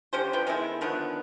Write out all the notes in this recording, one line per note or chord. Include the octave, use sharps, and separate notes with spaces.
D3 C#4 G4 C5
F3 B4 G5
D#3 G#3 B3 E4
D3 D#3 F3 B3